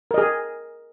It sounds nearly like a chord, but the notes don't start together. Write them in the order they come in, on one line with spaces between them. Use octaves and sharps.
A#4 D#5 G#4